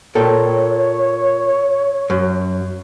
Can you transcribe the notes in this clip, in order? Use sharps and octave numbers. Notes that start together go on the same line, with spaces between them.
A#2 A4 C#5 G5
F#2